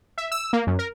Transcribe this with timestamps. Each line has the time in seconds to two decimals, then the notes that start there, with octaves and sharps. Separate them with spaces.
0.18 E5
0.32 E6
0.53 A#3
0.67 F#2
0.79 A#4